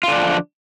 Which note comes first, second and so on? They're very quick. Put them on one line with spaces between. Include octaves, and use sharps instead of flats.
F4 D3 D4 F3